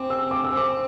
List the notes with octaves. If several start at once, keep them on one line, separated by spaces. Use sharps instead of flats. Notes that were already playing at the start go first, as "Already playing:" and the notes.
Already playing: C4 D6
E6
D6
E6
C4
D6